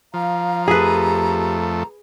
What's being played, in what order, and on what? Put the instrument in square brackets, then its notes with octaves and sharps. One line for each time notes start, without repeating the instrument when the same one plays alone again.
[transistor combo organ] F3 [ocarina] F5 [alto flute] A#5
[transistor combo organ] F2 A3 [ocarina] G4 [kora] G#4 B4